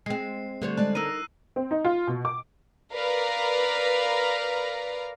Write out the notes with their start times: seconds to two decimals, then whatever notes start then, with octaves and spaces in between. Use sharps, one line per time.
0.06 G#3 C4 C7
0.62 D3 G3 A3 C5 C#5
0.77 G#3 D5 A5 F#6
0.95 D#4 A#4 A#5 E6 A#6 D#7
1.56 C4
1.71 D#4
1.85 F4
2.08 B2
2.25 D6
2.94 A#4 B4 D5 F5 A#5